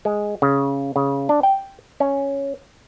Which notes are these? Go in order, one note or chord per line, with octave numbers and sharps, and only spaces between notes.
G#3
C#3
C#3
D4
G5
C#4